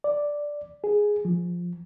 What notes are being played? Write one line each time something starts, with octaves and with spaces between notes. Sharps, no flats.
D5
G#4
F3